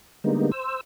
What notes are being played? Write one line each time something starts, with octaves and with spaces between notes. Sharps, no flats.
D3 G3 G#3 A#3 B3 D#4
C5 E6